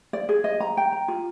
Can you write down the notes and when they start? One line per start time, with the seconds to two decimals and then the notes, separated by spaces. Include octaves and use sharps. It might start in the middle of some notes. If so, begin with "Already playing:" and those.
0.13 D5
0.29 G#4
0.44 D#5
0.60 A#5
0.77 G5
0.93 A#5
1.08 F4